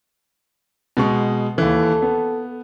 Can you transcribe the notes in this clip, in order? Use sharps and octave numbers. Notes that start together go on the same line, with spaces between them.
B2 G#3 C#6
D#2 E3 A4
B3